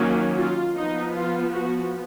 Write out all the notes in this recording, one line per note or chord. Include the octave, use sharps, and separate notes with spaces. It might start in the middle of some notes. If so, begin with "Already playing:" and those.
Already playing: D#3 F#3 A#3 C#4
F4
F3 B3 D#4
F4
F#4